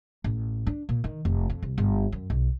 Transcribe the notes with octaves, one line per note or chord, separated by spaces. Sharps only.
A1
D4
A#2
D#3
F1
F2
C2
G1
F#2
B1